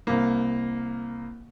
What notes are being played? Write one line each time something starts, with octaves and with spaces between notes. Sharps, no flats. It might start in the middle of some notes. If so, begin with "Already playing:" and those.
C2 A#3